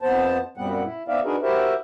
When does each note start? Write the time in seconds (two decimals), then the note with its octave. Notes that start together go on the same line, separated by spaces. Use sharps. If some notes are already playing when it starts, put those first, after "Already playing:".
0.02 F2 B3 C5 A5
0.57 F#2 A#2 G3 B3 C4 F#5
0.84 E4
1.08 B3 C4 D#4 D5 E5 F5
1.24 D4 D#4 F#4 G#4 A#4 B4
1.43 E4 F#4 G4 A#4 C5 E5